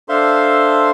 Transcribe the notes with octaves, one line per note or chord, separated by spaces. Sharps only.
D4 A4 C5 E5 F5 C6